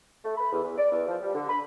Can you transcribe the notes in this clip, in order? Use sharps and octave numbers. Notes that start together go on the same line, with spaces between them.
A3
B5
E2
E2
D5
E2
F3
G3
D3
B5